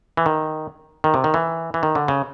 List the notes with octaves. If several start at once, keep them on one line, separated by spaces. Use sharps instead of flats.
E3
D#3
D#3
C3
D#3
E3
E3
D#3
D3
C#3